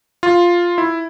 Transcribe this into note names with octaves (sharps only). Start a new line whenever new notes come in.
F4
E4